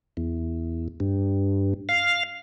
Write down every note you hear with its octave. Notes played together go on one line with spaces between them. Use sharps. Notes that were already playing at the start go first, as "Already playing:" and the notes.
E2
G2
F5